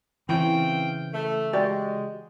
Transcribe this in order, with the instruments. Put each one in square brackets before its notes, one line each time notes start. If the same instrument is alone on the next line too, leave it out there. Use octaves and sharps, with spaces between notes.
[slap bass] C#3 [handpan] E3 [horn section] C4 F5 G5
[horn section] A3
[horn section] G#3 [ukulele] F#4 G4 D5